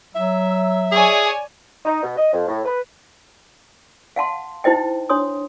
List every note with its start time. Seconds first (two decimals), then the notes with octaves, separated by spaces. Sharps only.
0.15 F#3 E5
0.92 G#4 C#5 D5 G#5
1.85 D#4
2.03 B2
2.17 D#5
2.32 F2
2.47 A2
2.65 B4
4.16 F5 F#5 A5 C6
4.64 D#4 E4 C5 D#5 G5
5.09 D4 C#5 C6 D#6